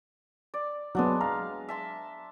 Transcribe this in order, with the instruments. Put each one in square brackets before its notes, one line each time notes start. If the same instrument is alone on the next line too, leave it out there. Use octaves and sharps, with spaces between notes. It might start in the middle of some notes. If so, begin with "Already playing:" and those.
[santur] D5
[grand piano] F#3 B3 [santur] G#3 D4 F#5
[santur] F5 [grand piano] A#5
[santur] E5 A5 C6